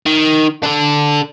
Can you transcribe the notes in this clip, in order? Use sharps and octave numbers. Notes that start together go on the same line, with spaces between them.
D#3
D4 A4